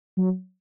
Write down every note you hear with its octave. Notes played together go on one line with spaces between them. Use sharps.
F#3